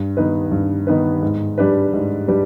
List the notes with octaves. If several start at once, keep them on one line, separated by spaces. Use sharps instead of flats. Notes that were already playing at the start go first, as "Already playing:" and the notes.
Already playing: G2
D#3 B3 D#4 B4
G2
D#3 B3 D#4 B4
G#2
G3 D4 G4 B4
G#2
G3 D4 G4 B4